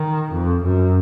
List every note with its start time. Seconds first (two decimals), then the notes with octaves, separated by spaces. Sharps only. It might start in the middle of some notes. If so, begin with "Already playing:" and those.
Already playing: D#3
0.32 F2
0.64 F#2